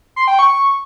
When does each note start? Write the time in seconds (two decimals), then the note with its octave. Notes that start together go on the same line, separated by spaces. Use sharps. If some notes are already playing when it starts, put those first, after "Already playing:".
0.16 C6
0.28 G5
0.39 C#6